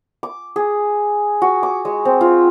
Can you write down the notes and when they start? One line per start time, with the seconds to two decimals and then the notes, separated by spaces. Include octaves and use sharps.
0.23 D6
0.56 G#4
1.42 F#4
1.63 D6
1.85 G#3
2.05 C4
2.21 F4